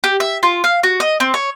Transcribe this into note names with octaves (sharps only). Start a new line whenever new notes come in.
G4
E5
F4
F5
F#4
D#5
C4
C#5